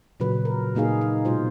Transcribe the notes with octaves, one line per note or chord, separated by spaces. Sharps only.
A#2 C#3 F#3 B4
A#4
A#2 A#3 D#4 G#4 F5
D#4
B2 G#3 F4 C5